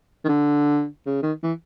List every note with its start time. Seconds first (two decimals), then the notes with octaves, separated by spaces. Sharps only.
0.24 D#3
0.28 D3
1.06 C#3
1.23 D#3
1.43 E3